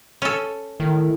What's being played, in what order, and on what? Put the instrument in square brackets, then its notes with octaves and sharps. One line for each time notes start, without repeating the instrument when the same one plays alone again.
[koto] C#4 A4
[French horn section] A2 E4 [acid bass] D#3